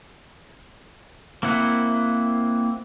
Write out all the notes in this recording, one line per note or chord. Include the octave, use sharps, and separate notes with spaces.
A#3 C4 E4 F#5